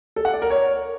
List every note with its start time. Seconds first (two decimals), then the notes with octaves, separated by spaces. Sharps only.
0.16 A4
0.25 F#5
0.33 D5
0.42 A#4
0.50 C#5